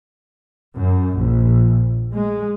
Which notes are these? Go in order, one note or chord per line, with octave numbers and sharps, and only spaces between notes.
F#2
A#1
G#3